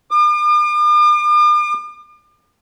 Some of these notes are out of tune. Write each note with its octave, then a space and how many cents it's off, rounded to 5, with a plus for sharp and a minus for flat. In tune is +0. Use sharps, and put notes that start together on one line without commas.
D6 +45